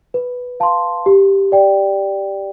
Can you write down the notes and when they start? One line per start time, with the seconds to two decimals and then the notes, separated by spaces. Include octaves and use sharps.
0.14 B4
0.60 F5 A5 C6
1.06 G4
1.52 D5 G5